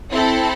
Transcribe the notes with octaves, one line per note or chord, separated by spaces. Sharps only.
C4 E4 A4